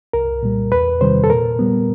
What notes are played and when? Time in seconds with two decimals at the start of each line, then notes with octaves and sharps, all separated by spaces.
0.13 C2 A#4
0.43 A#2 G3
0.72 E2 B4
1.01 C3 D#3 G3 C5
1.24 A4
1.30 A#2 A#4
1.59 G3 B3